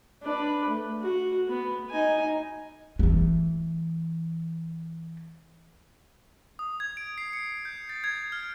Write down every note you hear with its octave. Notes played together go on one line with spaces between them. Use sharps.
D4 B4
A3
F#4
B3
D#4 G#5
E3 A3
D#6
G#6
D7
C7
C#7
G6
A6
G#6
F6